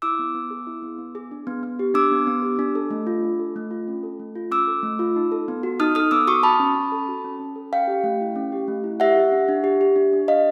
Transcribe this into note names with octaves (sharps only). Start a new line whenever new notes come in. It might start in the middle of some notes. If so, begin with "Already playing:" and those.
E4 D6 E6
B3
B3
G#4
E4
B3
B3
G#4
D4
B3
B3
G4
D4 D6 E6
B3
B3
G4
D4
A4
A3
F4
D4
A4
A3
F4
C#4
A4
A3
F4
C#4 D6 E6
A4
A3
F4
D#4
A4
B3
F#4
D#4 D#6 F6
A4 D#6 F6
B3 D6 E6
F#4 C#6 D#6
F#4 A5 B5
C#4
C#4
A4
F#4
C#4
C#4
A4
C#4 F5 G5
G4
A3
E4
C#4
G4
A3
E4
G4 E5 F#5
G4
D4
D4
G4
G4
D4
D4
D4 D#5 F5